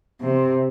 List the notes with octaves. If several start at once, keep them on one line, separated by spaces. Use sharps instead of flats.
C3